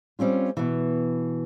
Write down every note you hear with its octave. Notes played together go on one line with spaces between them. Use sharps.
G3 C4 C#4 F4
B2 E3